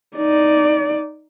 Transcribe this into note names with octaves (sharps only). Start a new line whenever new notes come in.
D#4 D5